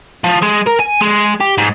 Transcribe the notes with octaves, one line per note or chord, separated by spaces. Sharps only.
F3
G#3
A#4
G#5
G#3
G4
G#2